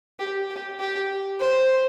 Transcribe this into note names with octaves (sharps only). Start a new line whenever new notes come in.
G4
G4
G4
C5